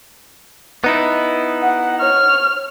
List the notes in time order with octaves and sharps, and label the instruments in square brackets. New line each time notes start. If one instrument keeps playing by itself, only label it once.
[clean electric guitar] B3 D#4 E4
[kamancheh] F#5
C#5 F6